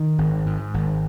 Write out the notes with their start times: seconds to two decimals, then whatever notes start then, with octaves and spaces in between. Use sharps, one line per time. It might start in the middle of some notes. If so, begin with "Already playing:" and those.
Already playing: D#3
0.18 G#1
0.46 G#2
0.74 G#1